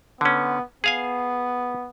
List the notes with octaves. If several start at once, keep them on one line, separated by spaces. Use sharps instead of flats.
D3 B3 C#4
B3 G#4 F5 G#5